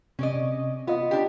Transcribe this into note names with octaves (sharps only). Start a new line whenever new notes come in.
C3 C#4 D5 D#5
B3 F4 D#5
D4 G4